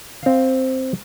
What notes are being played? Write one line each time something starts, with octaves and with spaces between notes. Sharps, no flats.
C4 F5